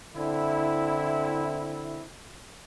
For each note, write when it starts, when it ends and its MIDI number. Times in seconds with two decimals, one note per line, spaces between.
0.17 2.03 50
0.17 2.03 60
0.17 2.03 64